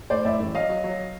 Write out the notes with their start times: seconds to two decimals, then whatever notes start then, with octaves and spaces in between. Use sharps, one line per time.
0.10 A2 C5 D5
0.25 A2 D5 E5
0.40 A1
0.54 F#3 D#5 F5
0.69 F#3
0.84 F#3